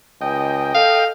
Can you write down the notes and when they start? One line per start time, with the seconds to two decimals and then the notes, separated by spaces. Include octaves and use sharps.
0.21 C#2 D#5 G5
0.75 A4 F5